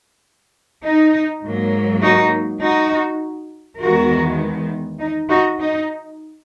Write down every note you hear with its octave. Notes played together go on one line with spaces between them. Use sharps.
D#4
G#2 F#3 A#3
D#4 F#4
D#4 F#4
E2 D#3 G#3 B3 F#4 A#4
D#4
D#4 F#4
D#4